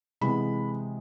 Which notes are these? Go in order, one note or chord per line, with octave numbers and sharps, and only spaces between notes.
C3 E3 G#3 B3 B5